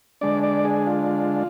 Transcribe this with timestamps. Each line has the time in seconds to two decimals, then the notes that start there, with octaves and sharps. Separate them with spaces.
0.21 D3 G#3 D4 D5
0.43 D5
0.65 G#4
0.87 F4